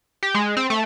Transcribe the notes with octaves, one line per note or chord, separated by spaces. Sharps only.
G4
G#3
C4
A3